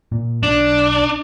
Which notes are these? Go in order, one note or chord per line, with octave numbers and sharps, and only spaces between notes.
A#2
B1 D4